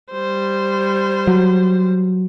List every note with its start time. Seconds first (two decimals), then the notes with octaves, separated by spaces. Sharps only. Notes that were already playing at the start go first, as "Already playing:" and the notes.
0.11 G3 C5
1.27 F#3